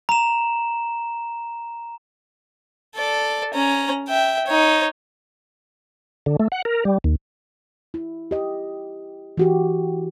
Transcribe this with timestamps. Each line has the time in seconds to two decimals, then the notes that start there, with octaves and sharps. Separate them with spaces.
0.09 A#5 E7
2.95 A4 D5
3.54 C#4 A#5
4.08 E5 G5
4.46 D#4 C#5
6.26 D3
6.39 A3
6.52 F#5
6.65 A#4
6.85 G3
7.04 D#2
7.94 E4
8.31 G4 D#5
9.37 E3 F#4 G4